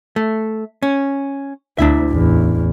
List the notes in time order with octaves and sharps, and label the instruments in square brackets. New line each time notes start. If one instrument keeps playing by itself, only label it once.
[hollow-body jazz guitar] A3
C#4
[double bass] D2 [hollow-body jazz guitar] D4 E4 E5
[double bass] A1 E2